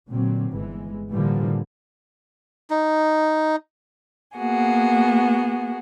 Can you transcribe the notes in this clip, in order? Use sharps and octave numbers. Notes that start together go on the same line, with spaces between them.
A#2 D3 F#3 C4
G1 E3 G#3
A2 D3 E3 F3 G3 A#3
D#4
A#3 B3 F#4 G#4